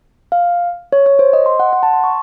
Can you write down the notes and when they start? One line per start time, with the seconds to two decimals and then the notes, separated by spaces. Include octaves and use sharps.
0.32 F5
0.92 C#5
1.06 C#5
1.19 C5
1.33 D#5
1.46 C6
1.60 F#5
1.73 F#5
1.83 A5
1.93 C6
2.04 C#6